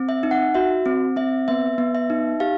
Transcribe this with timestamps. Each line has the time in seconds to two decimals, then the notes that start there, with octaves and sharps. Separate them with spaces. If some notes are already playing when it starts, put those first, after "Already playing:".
Already playing: C4
0.09 E5
0.23 D#4
0.31 F#5
0.54 F#4 E5
0.86 C4
1.16 C4 E5
1.48 B3 E5
1.78 B3
1.95 E5
2.10 D#4
2.40 G4 F5